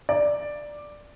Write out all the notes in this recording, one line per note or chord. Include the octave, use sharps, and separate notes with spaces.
D5